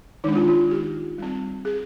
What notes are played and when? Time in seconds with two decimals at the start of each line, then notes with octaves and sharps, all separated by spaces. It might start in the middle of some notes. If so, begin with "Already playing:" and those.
0.24 D#3 G#3 D4 D#4
0.35 F4
0.48 F4
0.71 G4
1.18 G3 C4
1.65 G#4